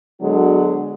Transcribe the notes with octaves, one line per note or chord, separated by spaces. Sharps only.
D3 F#3 G#3 B3 D4 F#4